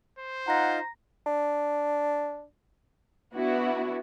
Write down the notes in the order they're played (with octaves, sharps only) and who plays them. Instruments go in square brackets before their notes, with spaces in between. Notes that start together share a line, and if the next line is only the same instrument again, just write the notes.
[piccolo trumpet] C5
[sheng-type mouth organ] D#4 F4 [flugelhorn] F#5 [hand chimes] A#5 A#6
[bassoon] D4
[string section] B3 D4 E4 F#4